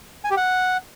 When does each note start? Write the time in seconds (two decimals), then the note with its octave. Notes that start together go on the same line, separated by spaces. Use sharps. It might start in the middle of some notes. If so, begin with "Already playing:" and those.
0.24 G#5
0.31 G4
0.37 F#5